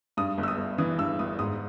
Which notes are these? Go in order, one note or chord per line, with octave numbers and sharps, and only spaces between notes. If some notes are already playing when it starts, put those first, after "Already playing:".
G2 D#6
G1
E6
D#6
G1
E3 D#6
G2 E6
G1 D#6
G#2 D#6